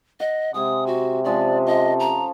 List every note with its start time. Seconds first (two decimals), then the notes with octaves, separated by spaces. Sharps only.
0.20 D#5 F#5
0.54 C3 G#3 G#5 D#6
0.87 F#4
1.24 F3 G#3 C#4 D5
1.67 F3 A4 D#5
2.00 A#5